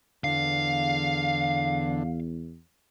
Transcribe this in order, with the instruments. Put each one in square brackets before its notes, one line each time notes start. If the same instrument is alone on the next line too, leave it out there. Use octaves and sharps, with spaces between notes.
[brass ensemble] E2 [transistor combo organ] D3 [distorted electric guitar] F5